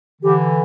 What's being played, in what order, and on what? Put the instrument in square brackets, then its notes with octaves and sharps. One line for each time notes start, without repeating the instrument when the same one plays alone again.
[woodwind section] D3 E3 [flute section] G4